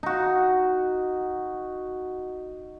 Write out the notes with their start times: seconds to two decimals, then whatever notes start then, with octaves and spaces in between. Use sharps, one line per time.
0.03 D#4 F#4